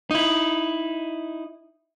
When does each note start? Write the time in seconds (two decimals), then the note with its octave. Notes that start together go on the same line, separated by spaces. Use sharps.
0.11 D#4 E4